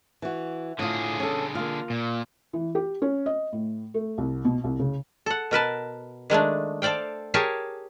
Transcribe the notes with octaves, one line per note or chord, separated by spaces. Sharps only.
E3 F#4
A2 D3 F4 G#4
C#4 A4
A#3 F4
A#2
E3
G4
C#4
D#5
A2
A3
C2
B2
C2
C#3
A4 F#5
B2 A#4 B4 A5
D#3 G#3 A3 D4
A4 C5 D5 F5 G5
G4 G#4 A#4 C#5 F5 A5